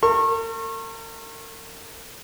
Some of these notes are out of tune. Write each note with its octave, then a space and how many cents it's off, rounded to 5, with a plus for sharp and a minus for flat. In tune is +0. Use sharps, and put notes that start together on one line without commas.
A#4 -45 C#6 -30